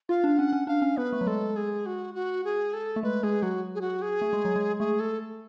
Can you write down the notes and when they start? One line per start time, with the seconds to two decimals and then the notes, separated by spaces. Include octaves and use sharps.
0.09 F4 F5
0.24 D4
0.38 C#4 F#5
0.52 C#4
0.67 D4 F5
0.82 C#4
0.97 B3 B4
1.13 A3
1.21 F#3
1.27 G#3 A4
1.56 G#4
1.86 F#4
2.15 F#4
2.45 G#4
2.73 A4
2.96 A3
3.03 G#3 B4
3.23 G#3 G#4
3.42 F#3 F#4
3.75 G#4
3.81 F#4
4.02 G#4
4.22 A3
4.33 G#3
4.45 F#3
4.56 G#3
4.79 A3 G#4
5.00 A4